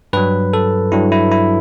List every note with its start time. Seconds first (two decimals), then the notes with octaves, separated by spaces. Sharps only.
0.13 G2 F#3 B4
0.53 A4
0.92 G2 F#3 E4
1.12 E4
1.31 E4